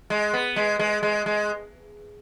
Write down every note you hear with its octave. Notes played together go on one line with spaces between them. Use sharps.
G#3
B3
G#3
G#3
G#3
G#3